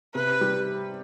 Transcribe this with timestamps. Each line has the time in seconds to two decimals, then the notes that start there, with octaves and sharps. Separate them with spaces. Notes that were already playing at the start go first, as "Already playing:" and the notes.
0.15 C3 B4
0.41 G3